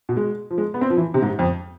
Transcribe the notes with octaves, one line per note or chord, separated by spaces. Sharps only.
B2
G#3
F3
G#3
B3
C4
F3
E3
C3
G#2
F2